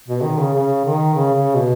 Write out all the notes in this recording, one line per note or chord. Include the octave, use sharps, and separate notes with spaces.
B2
D#3
C#3
C#3
D#3
C#3
C#3
B2